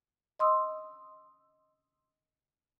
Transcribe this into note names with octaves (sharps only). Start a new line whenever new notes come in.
D#5 C6 D#6 E6